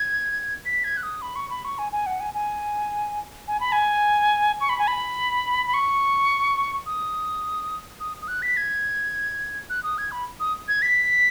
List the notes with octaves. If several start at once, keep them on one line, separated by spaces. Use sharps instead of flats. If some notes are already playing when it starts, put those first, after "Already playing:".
Already playing: G#6
B6
G#6
F#6
D#6
B5
C#6
B5
C#6
G#5
G#5
F#5
G#5
G#5
G#5
B5
G#5
C#6
B5
G#5
B5
B5
C#6
D#6
D#6
D#6
F#6
B6
G#6
F#6
D#6
G#6
B5
D#6
G#6
B6